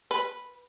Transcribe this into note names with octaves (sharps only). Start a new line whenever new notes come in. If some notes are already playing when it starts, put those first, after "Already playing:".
B4